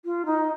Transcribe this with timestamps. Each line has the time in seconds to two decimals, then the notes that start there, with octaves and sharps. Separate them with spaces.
0.05 F4
0.26 D#4